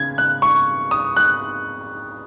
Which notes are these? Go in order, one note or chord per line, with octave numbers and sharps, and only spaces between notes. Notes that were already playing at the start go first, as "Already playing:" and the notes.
Already playing: C#3 G#6
F#6
C#6
D#6
F#6